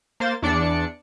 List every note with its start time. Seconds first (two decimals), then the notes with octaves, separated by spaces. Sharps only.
0.20 A#3 C5 A6
0.42 E2 D4 D5 C#7